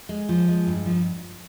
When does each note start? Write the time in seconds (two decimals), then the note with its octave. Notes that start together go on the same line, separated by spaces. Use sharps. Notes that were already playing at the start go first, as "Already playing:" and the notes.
0.09 G#3
0.29 F3
0.48 G#3
0.67 G2
0.85 F3